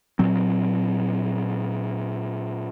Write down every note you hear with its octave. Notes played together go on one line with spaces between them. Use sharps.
A#2 F#3 C4